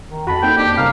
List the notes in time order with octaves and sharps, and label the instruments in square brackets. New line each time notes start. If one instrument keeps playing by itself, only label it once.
[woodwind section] D#3
[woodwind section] F2 [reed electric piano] F#4 A5 [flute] B5
[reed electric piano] A#3 C4 D#4 [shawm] G5
[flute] D4 [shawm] G4
[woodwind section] C2 F#2 A#4 [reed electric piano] A#2 C#3 C4 [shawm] F5